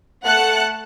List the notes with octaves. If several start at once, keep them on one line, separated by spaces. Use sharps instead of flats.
A3 F#5 A5 F#6 C#7